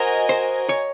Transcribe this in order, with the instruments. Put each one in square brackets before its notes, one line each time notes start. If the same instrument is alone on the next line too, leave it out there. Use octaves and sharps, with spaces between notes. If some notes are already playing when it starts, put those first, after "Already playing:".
Already playing: [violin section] F#4 A#4 D#5 G#5 [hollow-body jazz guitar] C5
[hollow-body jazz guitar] C5
C#5